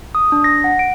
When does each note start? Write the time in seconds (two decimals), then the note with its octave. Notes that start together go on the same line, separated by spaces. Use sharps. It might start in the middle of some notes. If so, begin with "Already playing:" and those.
0.15 D#6
0.32 D4
0.44 A#6
0.64 F#5
0.79 D7